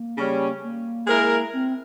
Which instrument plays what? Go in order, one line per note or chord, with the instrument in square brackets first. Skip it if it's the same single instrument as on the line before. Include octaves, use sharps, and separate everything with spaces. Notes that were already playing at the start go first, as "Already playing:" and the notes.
Already playing: [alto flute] A#3
[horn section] C#3 G3 C#4
[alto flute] A#3
[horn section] G#3 E4 A#4
[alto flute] C4